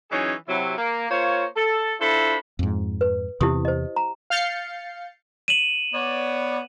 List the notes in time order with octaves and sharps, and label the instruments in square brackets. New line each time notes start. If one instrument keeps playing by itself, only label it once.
[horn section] E3 F#3 C#4 D#4 G#4 C#5
C3 F#3 E4
A#3
A#3 F4 C5 C#5
A4
D4 E4 F4 A4 C5 B5
[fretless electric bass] F2 G#2
[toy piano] B4
[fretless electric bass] E2 C3 E3 [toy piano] E4 G4 D#6
[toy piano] C5 D#5
A#5
[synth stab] F5 F6 G6 A6 C7 C#7
[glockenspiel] D#7 E7 F#7
[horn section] B3 C#5 D5